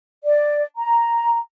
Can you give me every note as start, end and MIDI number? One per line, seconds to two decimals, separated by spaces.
0.24 0.61 74
0.76 1.37 82